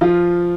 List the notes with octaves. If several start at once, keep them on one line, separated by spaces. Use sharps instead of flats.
F3 F4